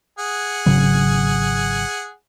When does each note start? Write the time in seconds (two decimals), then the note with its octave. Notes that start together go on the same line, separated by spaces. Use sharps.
0.19 G#4 F#5
0.66 G#1 C#3 F#3